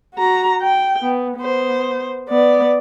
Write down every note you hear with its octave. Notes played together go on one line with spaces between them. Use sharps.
F#4 A#5
G5
B3
B3 C5
B3 D5